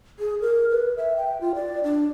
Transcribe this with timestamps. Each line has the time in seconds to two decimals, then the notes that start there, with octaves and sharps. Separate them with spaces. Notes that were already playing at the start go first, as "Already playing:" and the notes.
0.19 G#4
0.41 A#4
0.70 B4
0.97 E5
1.17 G5
1.41 F4
1.55 D5
1.84 D4